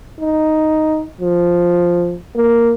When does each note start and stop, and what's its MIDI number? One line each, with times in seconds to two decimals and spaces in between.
0.21 1.04 63
1.21 2.18 53
2.36 2.73 58